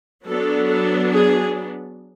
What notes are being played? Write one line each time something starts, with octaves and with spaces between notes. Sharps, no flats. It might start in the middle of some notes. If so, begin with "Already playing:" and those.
F#3 B3 D4 A4
A4
G#4